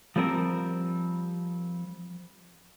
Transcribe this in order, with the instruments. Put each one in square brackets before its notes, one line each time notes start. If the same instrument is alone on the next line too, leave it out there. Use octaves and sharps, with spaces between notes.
[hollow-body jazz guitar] F3 G3 C4 A#4